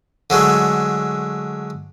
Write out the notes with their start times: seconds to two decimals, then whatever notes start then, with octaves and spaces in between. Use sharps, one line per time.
0.30 D3 F#3 G#3 A3